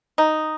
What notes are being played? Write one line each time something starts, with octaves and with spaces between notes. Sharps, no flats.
D#4